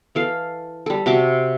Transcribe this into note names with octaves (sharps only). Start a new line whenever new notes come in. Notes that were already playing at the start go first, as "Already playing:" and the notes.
E3 A4 F5
G3 A4
C3 F#4 E5 D6